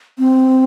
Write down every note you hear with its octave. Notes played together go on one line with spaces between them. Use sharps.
C4